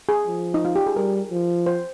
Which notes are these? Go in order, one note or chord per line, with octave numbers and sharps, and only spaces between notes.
G#4
F3
D#4
F4
G4
G#4
G3 A#4
F3
C5